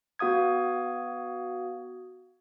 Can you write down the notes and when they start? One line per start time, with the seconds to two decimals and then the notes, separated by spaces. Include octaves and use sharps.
0.19 B3 F#4 F5 D#6 G#6